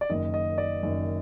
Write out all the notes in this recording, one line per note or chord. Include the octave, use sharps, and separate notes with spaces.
D5
F#1 F#2 D#3 D#5
D#5
D5
F#1 F#2 D#3